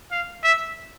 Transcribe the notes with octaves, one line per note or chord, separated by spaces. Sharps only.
F5
E5